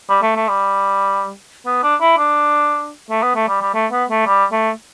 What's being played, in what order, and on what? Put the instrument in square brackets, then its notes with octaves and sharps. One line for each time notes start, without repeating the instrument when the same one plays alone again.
[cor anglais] G3
A3
A3
G3
B3
D4
E4
D4
A3
B3
A3
G3
G3
A3
B3
A3
G3
A3